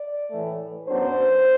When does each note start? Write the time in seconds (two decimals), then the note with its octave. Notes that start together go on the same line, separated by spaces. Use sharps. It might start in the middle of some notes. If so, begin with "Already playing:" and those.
Already playing: D5
0.31 A2 E3 A3
0.88 F#2 F#3 B3 D4 C5